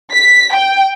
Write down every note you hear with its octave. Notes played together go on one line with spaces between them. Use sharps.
B6
G5